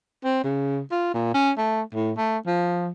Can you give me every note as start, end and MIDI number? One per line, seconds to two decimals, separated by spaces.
0.24 0.40 60
0.43 0.81 49
0.91 1.12 65
1.14 1.32 46
1.34 1.50 61
1.58 1.82 57
1.94 2.12 45
2.17 2.38 57
2.46 2.91 53